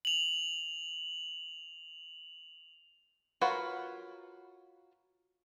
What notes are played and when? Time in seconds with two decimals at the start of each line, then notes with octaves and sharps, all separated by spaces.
0.05 F7 F#7
3.41 F4 F#4 A#4 B4 C#5